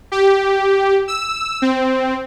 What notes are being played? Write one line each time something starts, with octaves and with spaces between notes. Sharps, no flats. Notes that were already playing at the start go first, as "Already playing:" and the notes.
G4
E6
C4